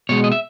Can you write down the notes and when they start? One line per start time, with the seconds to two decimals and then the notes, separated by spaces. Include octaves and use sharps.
0.09 B2 G#3 C#5
0.24 D#5
0.32 E5